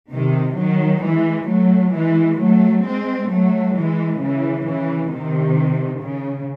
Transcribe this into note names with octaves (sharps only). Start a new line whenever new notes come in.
C3 D#3
D#3 F#3
E3 G#3
F#3 A3
E3 G#3
F#3 A3
G#3 C4
F#3 A3
E3 G#3
C#3 E3
C#3 E3
C3 D#3
C#3